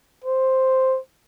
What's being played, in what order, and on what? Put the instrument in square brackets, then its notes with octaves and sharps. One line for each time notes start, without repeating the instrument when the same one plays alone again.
[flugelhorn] C5